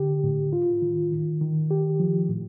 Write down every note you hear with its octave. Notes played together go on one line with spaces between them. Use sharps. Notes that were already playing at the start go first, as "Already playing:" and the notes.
Already playing: D3 G4
A2
F4
D#3
D#3
D#3
G4
F3
A2